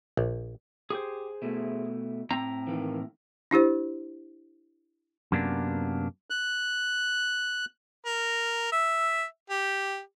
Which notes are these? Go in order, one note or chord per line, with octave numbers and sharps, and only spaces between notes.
A#1
G4 G#4 C5
B2 A3 E4
A2 C4 A#5
D#3 E3 A#3
D4 E4 G4 C5
F#2 C3 A#3 B3 D4
F#6
A#4
E5
G4